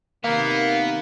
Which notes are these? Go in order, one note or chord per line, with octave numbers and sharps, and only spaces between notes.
C3 D#3 A#3 B3 F5